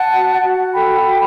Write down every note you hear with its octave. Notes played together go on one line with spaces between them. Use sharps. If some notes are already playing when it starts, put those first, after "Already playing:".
Already playing: F#5 A5
F#4
F#4
A4 G5 B5
F#4